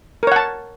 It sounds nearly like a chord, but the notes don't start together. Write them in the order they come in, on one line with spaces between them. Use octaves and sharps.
A#4 C#5 F#5 A5